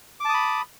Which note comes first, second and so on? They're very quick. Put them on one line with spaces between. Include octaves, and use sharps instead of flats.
D6 A5 D#6 B5